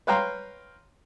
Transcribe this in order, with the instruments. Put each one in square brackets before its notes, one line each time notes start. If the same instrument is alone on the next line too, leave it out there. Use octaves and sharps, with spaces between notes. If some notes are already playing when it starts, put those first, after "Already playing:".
[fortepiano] B4 C#5 F5 G5 A#5 C6